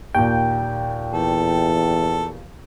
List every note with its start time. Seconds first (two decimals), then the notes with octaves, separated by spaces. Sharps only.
0.15 D#2 A#2 G5
1.13 E2 A4